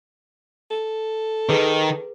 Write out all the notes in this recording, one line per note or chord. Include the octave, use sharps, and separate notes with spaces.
A4
D#3 G#4 B4